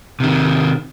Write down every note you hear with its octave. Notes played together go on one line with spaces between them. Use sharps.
C3 D#3